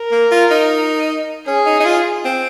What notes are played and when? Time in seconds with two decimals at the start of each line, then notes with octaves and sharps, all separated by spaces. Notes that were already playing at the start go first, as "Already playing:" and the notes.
Already playing: A#4
0.11 A#3
0.31 F4
0.51 D#4
1.47 C#4 G#4
1.66 D#4
1.80 D#4
1.85 F4
2.25 C4